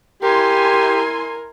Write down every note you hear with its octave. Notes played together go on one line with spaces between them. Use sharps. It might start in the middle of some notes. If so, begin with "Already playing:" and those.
E4 G4 A#4 G#5 C6